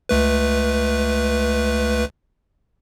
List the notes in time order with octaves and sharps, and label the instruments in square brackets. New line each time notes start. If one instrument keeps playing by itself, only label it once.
[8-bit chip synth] C#2 A3 B4